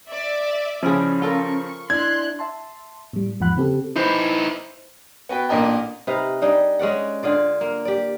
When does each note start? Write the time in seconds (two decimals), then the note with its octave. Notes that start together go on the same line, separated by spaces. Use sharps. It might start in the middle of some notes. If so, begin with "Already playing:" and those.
0.11 D5 E5
0.83 C#3 F3 C#4 E4 G#4
1.22 F4 A4 A#4 C#6
1.90 D4 E4 C6 F#6 G#6
2.39 E5 A5 C6
3.13 A2 G3
3.40 E2 G#2 F3 F#5 B5 F#6
3.56 C#3 C4 G4 A4
3.96 D#4 E4 B4 C5
5.29 B3 F#4 B4 G5
5.49 A1 A#2 D4 A#4 D#5 G5
6.07 C3 D#4 B4 F5
6.42 G3 D4 D#4 G#4
6.79 G#3 C#4 D5 F#5
7.23 D3 F4 G#4 D5
7.61 A#3
7.85 G4 D5